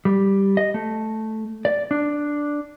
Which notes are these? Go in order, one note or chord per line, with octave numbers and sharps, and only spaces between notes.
G3
D#5
A3
D5
D4